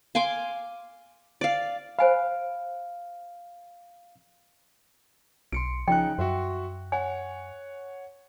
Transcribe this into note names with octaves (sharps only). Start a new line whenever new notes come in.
F5 G#5 C6 D6
D5 F5
C5 F5 G#5 B5
B1 C6 C#7 D7
C#3 F3 D#4 G5 F#6
F#2 F#4 E5 C6
C#5 F#5 G#5